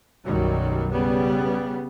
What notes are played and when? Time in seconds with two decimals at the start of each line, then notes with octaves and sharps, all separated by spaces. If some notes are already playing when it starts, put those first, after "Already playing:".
0.24 B1 F#2 D#3 F#3 G3
0.91 C#3 G3 B3